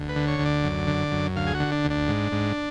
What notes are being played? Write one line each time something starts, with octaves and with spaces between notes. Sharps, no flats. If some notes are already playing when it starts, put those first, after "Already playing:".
Already playing: D2
B4
D3
C#5
D2
D5
F#2
D3
F#2
D2 F5
G#4
F#4
D3
D4
D2
D4
G#2
G#2